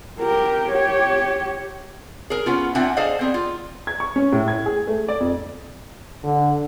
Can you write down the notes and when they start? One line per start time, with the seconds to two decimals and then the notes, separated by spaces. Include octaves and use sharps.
0.19 G4 A#4
0.71 G4 C#5
2.30 G#4 A#4
2.46 B3 C#4 F4
2.75 C4 D4 F4 E5 F#5 G#5
2.97 G#4 A4 C5 D5 D#5 F5
3.19 B3 C4 G#4
3.34 F4
3.87 G#6
4.00 C#6
4.16 C#4
4.33 A2
4.48 G#6
4.66 G#4
4.87 A3
5.08 D5
5.20 F2
6.24 D3